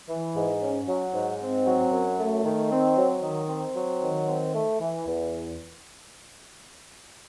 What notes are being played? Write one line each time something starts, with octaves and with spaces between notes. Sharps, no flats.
E3
G#2
C#4
F#3
G#2
C4
F#3
F#2
A3
D#3
C4
F#3
D#3
C4
F#3
D#3
C4
A3
E3
E2